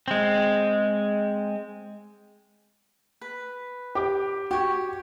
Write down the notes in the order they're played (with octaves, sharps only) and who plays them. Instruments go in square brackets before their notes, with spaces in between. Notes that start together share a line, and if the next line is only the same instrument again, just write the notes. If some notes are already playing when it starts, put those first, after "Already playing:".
[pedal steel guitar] G#3 C4
[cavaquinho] B4
[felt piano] G4 D6
[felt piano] F#4 [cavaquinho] G4 C#5